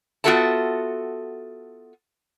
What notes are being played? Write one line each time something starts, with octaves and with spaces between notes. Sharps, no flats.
B3 F4 F#4 A4 E5 A5